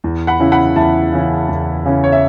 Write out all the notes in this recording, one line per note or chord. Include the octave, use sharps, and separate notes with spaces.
E2
F#5 B5
C#3 E3 C#4 E4
F#5 B5
E2 E5 A5
C#3 E3 C#4 E4
E2
C#3 E3 C#4 E4
C#5
E5